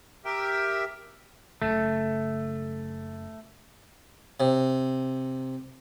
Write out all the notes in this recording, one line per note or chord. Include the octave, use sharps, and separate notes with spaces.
G4 A#4 E5 G5
F#1 C#3 A3
C3